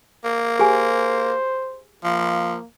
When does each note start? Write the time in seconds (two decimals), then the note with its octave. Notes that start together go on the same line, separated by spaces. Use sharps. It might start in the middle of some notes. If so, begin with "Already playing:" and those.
0.25 A#3
0.59 G4 G#4 C5 G#5
2.04 F3 A#3